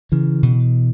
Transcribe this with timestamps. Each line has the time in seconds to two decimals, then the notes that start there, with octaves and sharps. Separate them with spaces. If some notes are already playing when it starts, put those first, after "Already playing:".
0.12 C#3 E3
0.43 B2